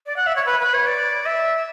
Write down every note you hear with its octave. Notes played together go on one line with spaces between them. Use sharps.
D5
F#5
E5
C#5
B4
B4
C#5
D5
E5